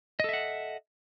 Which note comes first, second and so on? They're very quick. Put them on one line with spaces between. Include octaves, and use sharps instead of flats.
D#5 A4 E5 F#5